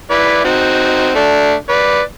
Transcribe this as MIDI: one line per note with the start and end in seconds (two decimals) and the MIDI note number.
0.10 0.40 64
0.10 0.40 71
0.10 0.40 74
0.45 1.10 60
0.45 1.10 63
0.45 1.10 66
1.15 1.53 57
1.15 1.53 62
1.69 2.01 71
1.69 2.01 74